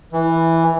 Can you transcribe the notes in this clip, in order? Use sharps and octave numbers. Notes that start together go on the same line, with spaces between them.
E3